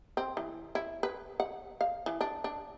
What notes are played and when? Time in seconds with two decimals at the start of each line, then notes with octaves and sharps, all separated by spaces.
0.17 C4
0.37 E3
0.75 E4
1.03 B4
1.40 F#5
1.81 F5
2.06 E3
2.21 D4
2.44 D4